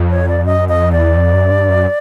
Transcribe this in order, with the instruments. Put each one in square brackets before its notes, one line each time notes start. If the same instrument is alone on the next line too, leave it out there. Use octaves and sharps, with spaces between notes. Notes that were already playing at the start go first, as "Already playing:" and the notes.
Already playing: [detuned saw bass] F2
[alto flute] C#5
D5
[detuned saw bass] F#2 [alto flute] D#5
[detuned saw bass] F2 [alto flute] D#5
[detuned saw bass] E2 [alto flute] D5
[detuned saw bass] F2
F#2
G2
F#2